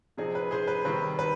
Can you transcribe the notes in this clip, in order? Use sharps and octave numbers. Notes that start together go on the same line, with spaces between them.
C3 F3 C4 D#4 G#4
B4
G#4 C5
B4
C3 D#3 G3 C4 B4
B4